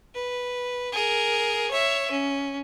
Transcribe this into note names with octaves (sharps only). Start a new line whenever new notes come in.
B4
G#4 A#4
C#5 E5
C#4